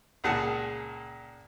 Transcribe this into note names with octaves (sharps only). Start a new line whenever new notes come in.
C#2 A#2 G#4 F#5 A5 F#6